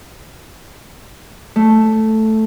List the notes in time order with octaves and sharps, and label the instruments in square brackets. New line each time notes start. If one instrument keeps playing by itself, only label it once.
[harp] A3